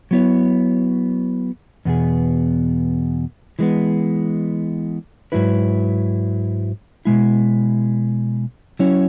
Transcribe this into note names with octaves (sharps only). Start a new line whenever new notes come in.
F#3 B3 E4 C#5
E2 B2 B3 G#4
E3 G#3 B3
G#2 F#3 E4 B4
B2 G#3 E4
F#3 C#4 E4 C#5